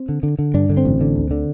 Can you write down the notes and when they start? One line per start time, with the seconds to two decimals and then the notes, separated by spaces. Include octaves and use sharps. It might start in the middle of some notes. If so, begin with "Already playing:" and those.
Already playing: C4
0.09 D3
0.23 D3
0.39 D3
0.54 G2 D4
0.70 D3
0.77 C4
0.85 A1
1.01 D3
1.16 D2
1.31 D3